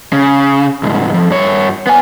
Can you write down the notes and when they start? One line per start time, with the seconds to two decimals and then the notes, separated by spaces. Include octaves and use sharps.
0.13 C#3
0.83 C2 G#2
1.14 F2
1.30 G2 C#5
1.87 B3 G#5